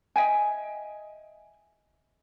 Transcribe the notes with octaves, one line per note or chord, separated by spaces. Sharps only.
D#5 E5 G5 G#5